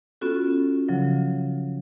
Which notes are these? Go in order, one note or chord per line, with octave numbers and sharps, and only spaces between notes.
B3 C#4 F4 F#4 A4
C#3 F3 F#3